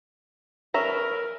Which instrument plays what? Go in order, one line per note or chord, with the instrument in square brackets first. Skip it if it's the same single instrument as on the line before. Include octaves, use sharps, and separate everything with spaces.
[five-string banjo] C#4 E5 A#5 [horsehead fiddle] A#4 B4